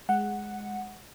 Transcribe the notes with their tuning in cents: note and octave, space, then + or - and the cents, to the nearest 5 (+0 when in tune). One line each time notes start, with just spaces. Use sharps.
G#3 +0 F#5 +0